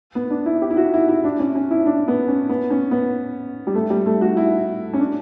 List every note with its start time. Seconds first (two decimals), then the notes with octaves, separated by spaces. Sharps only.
0.15 B3
0.30 D4
0.46 E4
0.62 G4
0.70 E4
0.77 F#4
0.93 E4
1.08 E4
1.24 D4
1.39 C#4
1.55 C#4
1.71 E4
1.86 D4
2.08 B3
2.28 C#4
2.49 B3
2.70 C#4
2.91 B3
3.67 G3
3.74 A3
3.90 G3
4.06 A3
4.21 F#4
4.37 E4
4.93 C#4
4.99 D4